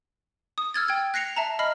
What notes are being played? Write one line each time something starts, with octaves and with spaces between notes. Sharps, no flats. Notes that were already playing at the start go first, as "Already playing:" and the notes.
D#6
E6 F6 G#6 A6
G5 G#6
F#6 A#6 C7 C#7 F7
E5 A5 A#5
D#5 B5 F6 C7